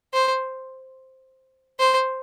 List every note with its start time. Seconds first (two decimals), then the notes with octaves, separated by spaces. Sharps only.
0.13 C5
1.79 C5